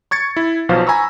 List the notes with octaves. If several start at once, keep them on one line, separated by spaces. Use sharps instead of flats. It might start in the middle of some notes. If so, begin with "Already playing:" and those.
C#6 G#6 A6 C#7
E4
B1 B2 F3 C5 F5
G#5 A#5 B5 C#6 E6